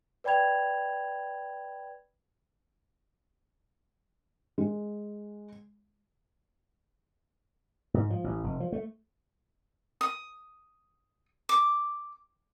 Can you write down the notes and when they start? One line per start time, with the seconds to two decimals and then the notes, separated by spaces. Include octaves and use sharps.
0.24 B4 D5 G5 B5 G#6 F7
4.58 G#3
7.94 G#2
8.10 F3
8.24 A1
8.44 F1
8.60 F3
8.72 A3
10.01 D#6
11.49 D6